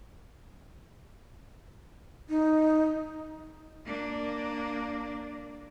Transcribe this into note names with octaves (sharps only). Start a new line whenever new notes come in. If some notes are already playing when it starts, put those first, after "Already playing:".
D#4
A#3 D4